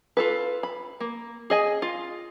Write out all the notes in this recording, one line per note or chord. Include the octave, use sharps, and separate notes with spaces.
F4 A4 B4
B5
A#3
G#4 D#5 G#5
F4